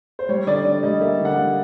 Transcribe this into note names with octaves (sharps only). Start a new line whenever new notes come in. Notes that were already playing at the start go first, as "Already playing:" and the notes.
C5
G3 C#5
D3 D5
D3 D5
G3 D#5
A#3 E5
D3
F#5
G3 F5